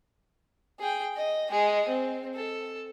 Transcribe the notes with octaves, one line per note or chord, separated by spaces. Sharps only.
G#4 G5
D#5
G#3 G#4
C4
A4